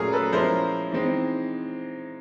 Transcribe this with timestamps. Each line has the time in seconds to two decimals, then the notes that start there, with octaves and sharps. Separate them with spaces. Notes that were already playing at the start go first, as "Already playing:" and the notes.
Already playing: A#2 F#3 A3 C#4 G#4 A#4
0.13 A4 B4
0.32 F3 G#3 C#4 E4 A#4 C5
0.92 E3 G#3 C4 D#4